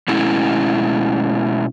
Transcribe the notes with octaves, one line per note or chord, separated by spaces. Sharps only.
B2 G#3 A3 C#4 E4